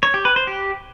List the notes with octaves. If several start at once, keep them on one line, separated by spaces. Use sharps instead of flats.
C#5
G4
B4
C5
G4